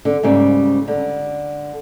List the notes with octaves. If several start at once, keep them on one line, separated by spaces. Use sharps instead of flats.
D3
G#2 C#3 G3 A#3 C4
D3